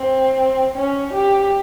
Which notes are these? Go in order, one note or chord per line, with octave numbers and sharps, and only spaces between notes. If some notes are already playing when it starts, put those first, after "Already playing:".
Already playing: C4
C#4
G4